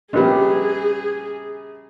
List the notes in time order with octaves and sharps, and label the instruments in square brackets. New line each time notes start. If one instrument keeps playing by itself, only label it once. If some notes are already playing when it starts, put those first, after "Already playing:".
[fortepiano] A#1 B3 [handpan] C#4 G4 [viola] G#4